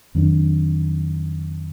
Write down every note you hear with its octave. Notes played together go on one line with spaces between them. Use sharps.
F2 D#3 F#3 D4